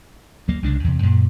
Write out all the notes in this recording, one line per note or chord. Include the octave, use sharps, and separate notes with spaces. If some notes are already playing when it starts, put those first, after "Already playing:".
D2 F#3 A#3
C2 C#3 G#3 D4
E2 C3
F#2 A#2